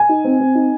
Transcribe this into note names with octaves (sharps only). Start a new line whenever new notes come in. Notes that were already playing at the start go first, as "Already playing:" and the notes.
Already playing: G#5
D#4
C4
C4
D#4